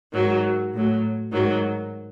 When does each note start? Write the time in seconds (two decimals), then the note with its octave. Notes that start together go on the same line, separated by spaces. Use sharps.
0.12 G#2 D#3 F#3
0.73 A2 F#3
1.32 G#2 D#3 F#3